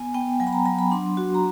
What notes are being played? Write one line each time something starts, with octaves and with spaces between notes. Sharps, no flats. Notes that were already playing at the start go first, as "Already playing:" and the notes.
Already playing: B3 G#5
B3 G5
F#3 G#5
B5
A#5
F#3 B5
B5
D4 C6
F#4
A#5